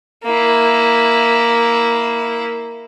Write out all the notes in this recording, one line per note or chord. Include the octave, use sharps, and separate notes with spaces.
A#3 E4